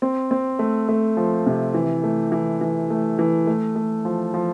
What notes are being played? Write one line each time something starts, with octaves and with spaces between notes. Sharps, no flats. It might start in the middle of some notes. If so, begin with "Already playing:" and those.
C4
C4
A3
A3
F3
C3
E3
A3
E3
E3
A3
E3
A3
A3
F3
F3